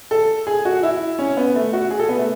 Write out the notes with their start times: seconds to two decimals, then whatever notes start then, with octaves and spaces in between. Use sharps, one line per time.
0.11 A4
0.47 G#4
0.65 F#4
0.83 E4
1.19 C#4
1.37 B3
1.55 A3
1.73 F#4
1.91 G#4
1.99 A4
2.09 B3
2.18 A3